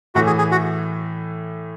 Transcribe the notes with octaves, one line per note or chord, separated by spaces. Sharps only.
A2 E3 A3 F#4
G#4
G#4
F#4